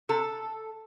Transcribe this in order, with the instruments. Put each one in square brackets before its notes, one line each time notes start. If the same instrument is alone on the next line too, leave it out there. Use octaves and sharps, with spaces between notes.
[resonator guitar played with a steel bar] C3 A4